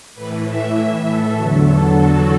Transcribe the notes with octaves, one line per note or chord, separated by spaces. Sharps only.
A2 E3 B4
E5
A4
E2 D3 F#3 F#4
A4
F#4